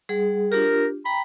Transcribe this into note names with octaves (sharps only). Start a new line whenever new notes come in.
G3 G#4 F#5
D4 F4 G4 A#4
G5 A#5 B5